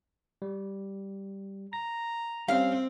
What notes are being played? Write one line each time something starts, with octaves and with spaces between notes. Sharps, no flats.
G3
A#5 A#6
G3 C4 C#4 F5 F6